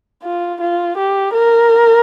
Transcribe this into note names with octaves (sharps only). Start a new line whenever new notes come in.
F4
F4
G4
A#4